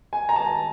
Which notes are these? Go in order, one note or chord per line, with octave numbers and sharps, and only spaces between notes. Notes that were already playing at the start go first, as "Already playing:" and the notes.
G#5
A#5
A5